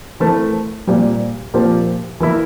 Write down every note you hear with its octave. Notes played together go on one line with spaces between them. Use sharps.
E3 A3 C4 E4 A#4
A#2 G3 C4
A#2 F3 C4 G4 A#4
E3 A#3 E4 A#4